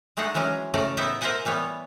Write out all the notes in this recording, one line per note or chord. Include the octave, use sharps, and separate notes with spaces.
G#3 A3 D4 D#4 G#4 F#5
E3 F#3 G#3 C#4 D#5
A2 C#3 A3 A4 D5 A#5
B3 D#4 E4 E5 G5
A#4 C5 D#5 E5 F#5 G#5
E3 G3 B3 C#5